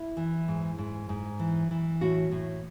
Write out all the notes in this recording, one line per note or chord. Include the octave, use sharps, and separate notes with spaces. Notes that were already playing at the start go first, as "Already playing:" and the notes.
Already playing: E4
E3
G#2
G#2
G#2
E3
E3
A2 F#4
A2